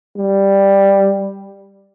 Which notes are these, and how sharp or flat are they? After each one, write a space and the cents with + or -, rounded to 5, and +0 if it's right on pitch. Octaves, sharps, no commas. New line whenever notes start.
G3 +5